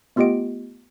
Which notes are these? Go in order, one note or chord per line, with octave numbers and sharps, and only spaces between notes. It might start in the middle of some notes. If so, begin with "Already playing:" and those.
A3 B3 F4 G4 D#5 D7